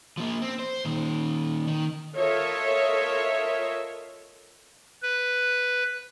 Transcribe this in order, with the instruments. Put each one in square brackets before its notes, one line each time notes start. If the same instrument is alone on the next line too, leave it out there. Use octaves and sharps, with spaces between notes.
[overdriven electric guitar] F3 A#3
C4
C5
A#2 D#3
D#3
[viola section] F4 A4 A#4 C#5 D#5 E5
[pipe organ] B4